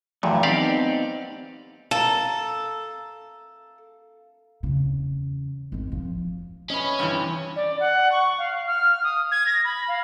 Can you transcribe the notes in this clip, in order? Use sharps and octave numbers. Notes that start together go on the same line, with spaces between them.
E2 G2 A#2 E3 F#3 A3
B3 C4 D#4 G4 D5 F5
A4 F5 A#5
E2 C#3
G#1 F2
F3
C#4 B4 D#5
G2 C3 E3
D5
F#5
C#6
F5
F6
D#6
G#6
A#6
B5
F5